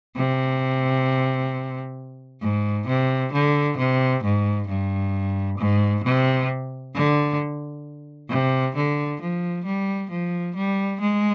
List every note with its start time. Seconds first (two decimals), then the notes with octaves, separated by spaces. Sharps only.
0.16 C3
2.42 G#2
2.88 C3
3.33 D3
3.78 C3
4.23 G#2
4.68 G2
5.58 G#2
6.04 C3
6.95 D3
8.30 C3
8.76 D3
9.21 F3
9.65 G3
10.10 F3
10.55 G3
11.00 G#3